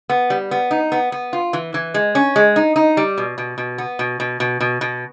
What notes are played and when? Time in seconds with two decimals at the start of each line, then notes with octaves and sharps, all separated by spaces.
0.10 B3
0.30 G3
0.51 B3
0.71 D#4
0.92 B3
1.12 B3
1.33 F4
1.53 E3
1.74 E3
1.94 G#3
2.15 C#4
2.36 G#3
2.56 D#4
2.76 D#4
2.97 G3
3.18 B2
3.38 B2
3.58 B2
3.78 B3
3.99 B2
4.20 B2
4.40 B2
4.61 B2
4.81 B2